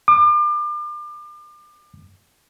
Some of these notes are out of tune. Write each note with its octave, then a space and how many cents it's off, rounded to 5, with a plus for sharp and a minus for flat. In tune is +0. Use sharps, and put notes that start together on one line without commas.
D6 +35